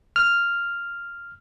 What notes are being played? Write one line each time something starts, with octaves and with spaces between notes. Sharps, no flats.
F6